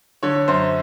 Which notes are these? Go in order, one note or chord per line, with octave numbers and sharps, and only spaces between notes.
D3 C#5
F#2 C5